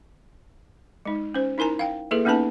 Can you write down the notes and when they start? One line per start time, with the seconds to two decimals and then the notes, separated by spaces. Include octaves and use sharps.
1.05 G#3 D#4
1.34 C#4 C5
1.58 D#4 E4 A#4 G#5 A#5
1.79 F5 G5
2.11 A#3 E4 G#4 A4 B4 E5
2.25 A#3 B3 C#4 D#4 B4 A5